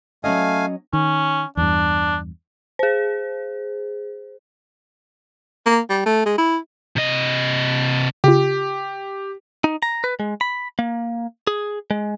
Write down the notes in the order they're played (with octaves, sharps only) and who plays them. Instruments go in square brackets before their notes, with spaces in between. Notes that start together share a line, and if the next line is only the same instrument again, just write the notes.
[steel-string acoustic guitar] F#3 C#4 D#5 [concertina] A3 F5 G#5
[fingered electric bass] D#3 [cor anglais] C#4
[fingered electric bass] E2 G2 [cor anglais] D4
[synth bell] G#4 C5
[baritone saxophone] A#3
G3
A3
G#3
E4
[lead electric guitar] C3 D#5
[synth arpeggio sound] C#3 F4 [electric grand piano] G4
[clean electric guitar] D#4
A#5
B4
G#3
B5
A#3
G#4
G#3